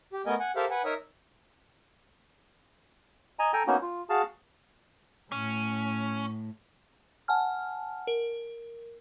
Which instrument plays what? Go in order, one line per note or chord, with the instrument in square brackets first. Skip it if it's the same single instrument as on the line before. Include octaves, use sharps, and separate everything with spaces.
[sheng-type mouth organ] G4
A3 B3 A#4 D#5 G#5
F#5 G#5
G4 A4 A#4 C5 E5 F5
B4 F#5 G#5
D#4 A#4 C#5 E5 D#6
[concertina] D#5 G#5 A#5
A4 G5 G#5 A#5
A#3 B3 C#4 D#4 F#4
F4
F#4 G#4 F5 A5
[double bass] A2 [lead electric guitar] C#4
[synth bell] F#5 G#5 A5 F6
A#4